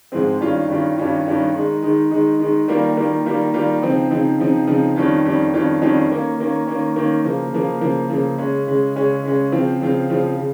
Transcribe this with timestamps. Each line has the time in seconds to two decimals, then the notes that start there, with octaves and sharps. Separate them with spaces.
0.12 G#2 F3 G#3 C4
0.40 G2 D#3 G3 C#4 F4
0.69 G2 D#3 G3 C#4 F4
0.97 G2 D#3 G3 C#4 F4
1.25 G2 D#3 G3 C#4 F4
1.54 D#3 G#3 D#4
1.82 D#3 G#3 D#4
2.11 D#3 G#3 D#4
2.39 D#3 G#3 D#4
2.68 D#3 G3 A#3 F4
2.96 D#3 G3 A#3 F4
3.25 D#3 G3 A#3 F4
3.54 D#3 G3 A#3 F4
3.82 C#3 F3 C4 D#4
4.11 C#3 F3 C4 D#4
4.39 C#3 F3 C4 D#4
4.67 C#3 F3 C4 D#4
4.96 F2 D#3 G3 C#4 F4
5.24 F2 D#3 G3 C#4 F4
5.53 F2 D#3 G3 C#4 F4
5.82 F2 D#3 G3 C#4 F4
6.10 D#3 A#3 C#4
6.39 D#3 A#3 C#4
6.67 D#3 A#3 C#4
6.96 D#3 A#3 C#4
7.24 C#3 F3 A#3
7.53 C#3 F3 A#3
7.81 C#3 F3 A#3
8.10 C#3 F3 A#3
8.38 C#3 G#3 C#4
8.67 C#3 G#3 C#4
8.96 C#3 G#3 C#4
9.24 C#3 G#3 C#4
9.52 C#3 F3 C4 F4
9.81 C#3 F3 C4 F4
10.09 C#3 F3 C4 F4
10.38 C#3